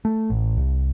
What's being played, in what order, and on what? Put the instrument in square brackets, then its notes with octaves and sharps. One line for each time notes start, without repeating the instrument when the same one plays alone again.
[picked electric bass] A3
A1
C2